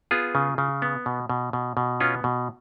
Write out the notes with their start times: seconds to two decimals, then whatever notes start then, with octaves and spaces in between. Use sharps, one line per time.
0.11 B3 F4 G#4
0.35 C#3
0.58 C#3
0.82 B3
1.06 B2
1.30 B2
1.53 B2
1.77 B2
2.00 B3 C#4 F4
2.24 B2